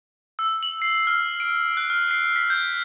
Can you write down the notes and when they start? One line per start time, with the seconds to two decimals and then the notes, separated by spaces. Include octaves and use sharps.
0.39 E6
0.63 F#7
0.82 C7
1.07 F6
1.40 D7
1.77 F#6
1.90 F6
2.11 C7
2.36 B6
2.50 G6